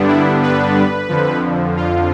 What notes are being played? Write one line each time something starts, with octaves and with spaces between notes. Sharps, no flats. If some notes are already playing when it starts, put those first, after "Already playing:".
Already playing: G2 D3 G3 B3 D4
E4
B4
F2 D3 F3
F4